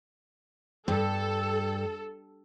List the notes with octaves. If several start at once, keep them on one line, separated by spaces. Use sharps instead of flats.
G2 A4